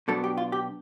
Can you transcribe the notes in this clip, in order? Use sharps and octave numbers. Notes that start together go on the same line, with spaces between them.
B2 F#3 B3 D4 A4
G4
F4
G4